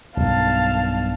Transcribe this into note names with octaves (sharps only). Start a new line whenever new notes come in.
B1 G2 F5 A5